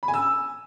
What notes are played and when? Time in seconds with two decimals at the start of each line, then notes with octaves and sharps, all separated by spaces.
0.03 B5
0.08 G#5
0.14 E6